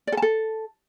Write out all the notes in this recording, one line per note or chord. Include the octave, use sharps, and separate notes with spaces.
D5
A4
A5
A4